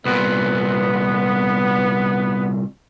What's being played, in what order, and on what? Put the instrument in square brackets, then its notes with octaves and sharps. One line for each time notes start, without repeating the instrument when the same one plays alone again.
[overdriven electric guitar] C2 A#2 [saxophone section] B3